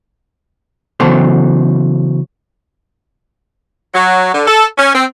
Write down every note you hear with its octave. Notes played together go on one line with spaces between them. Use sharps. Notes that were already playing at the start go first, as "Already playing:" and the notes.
C#3 E3 F#3 B3 A4 C5
F#3
D3
A4
C#4
C4